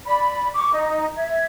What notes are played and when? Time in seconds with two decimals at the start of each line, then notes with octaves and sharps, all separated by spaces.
0.05 D5 B5
0.53 C#6 D6
0.73 D#4 D#5
1.16 E5 G#6